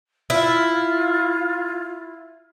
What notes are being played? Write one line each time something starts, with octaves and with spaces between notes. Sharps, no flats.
E4 F4